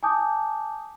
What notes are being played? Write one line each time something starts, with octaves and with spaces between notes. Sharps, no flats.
G#5 A5 D6 D#6 G6